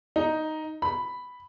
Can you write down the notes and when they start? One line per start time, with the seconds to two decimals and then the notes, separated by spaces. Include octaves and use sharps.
0.16 D#4
0.82 B5